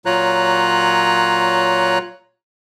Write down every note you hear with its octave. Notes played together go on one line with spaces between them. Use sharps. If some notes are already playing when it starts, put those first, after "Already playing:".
A#2 F#3 F4 C#5 A#5 F#6